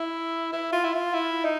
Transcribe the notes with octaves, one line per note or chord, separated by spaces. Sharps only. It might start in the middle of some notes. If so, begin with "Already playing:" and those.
Already playing: E4
E4
F4
E4
F4
E4
D#4